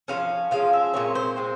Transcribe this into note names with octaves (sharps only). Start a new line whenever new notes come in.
F3 G#3 C#4 F5
F3 G#3 C#4 F5
E5
A#2 G#3 C4 C#5
C5
A#2 G#3 C4